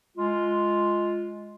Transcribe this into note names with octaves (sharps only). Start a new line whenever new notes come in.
G#3 F4